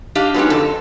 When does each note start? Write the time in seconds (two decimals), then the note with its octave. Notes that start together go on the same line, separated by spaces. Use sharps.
0.15 D4 G4 D#5 F5
0.34 F#3 G#3 B3 C#4 D#4 G4
0.50 F2 D3 A4